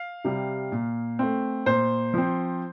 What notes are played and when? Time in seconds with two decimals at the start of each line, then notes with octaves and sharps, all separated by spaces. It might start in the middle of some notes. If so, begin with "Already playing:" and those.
Already playing: F5
0.24 C3 G3
0.72 A#2
1.19 A3 C4
1.66 A#2 C5
2.14 F3 C4